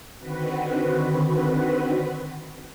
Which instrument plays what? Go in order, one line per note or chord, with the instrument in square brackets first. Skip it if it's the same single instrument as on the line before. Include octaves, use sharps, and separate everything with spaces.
[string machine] D3 D#3 C4 F#4 B4